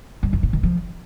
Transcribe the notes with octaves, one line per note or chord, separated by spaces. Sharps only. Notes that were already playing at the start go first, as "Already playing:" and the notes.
G2
F2
A2
D#3
F3